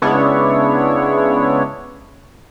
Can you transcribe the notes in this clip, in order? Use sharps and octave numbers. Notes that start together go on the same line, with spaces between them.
C#3 G#3 B3 D4 E4 C#5